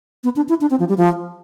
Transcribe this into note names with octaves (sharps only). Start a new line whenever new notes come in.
B3
D4
E4
D4
C4
F3
G3
F3